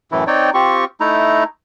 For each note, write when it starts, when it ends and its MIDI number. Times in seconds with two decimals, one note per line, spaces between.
0.12 0.24 42
0.12 0.24 45
0.12 0.24 52
0.12 0.24 64
0.27 0.50 60
0.27 0.50 63
0.27 0.50 73
0.27 0.50 74
0.27 0.50 79
0.54 0.85 60
0.54 0.85 65
0.54 0.85 67
0.54 0.85 85
1.00 1.44 57
1.00 1.44 63
1.00 1.44 64
1.00 1.44 82